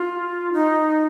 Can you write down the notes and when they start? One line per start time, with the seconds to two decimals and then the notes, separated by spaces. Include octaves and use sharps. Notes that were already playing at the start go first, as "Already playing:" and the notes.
Already playing: F4
0.53 D#4